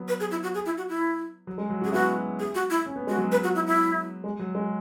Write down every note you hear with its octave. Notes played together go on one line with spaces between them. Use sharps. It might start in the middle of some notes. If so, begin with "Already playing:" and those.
Already playing: F#3 B3
B4
G#4
E4
F#4
G#4
E4
F#4
E4
F#3
G#3
F#3
C#4 F#4
G#4
B3 E4 F#4
G#4
F#4
E4
C#4
B3
G#3 F#4
F#3 B3
B4
F#4
E4
E4
G#3
F#3
G#3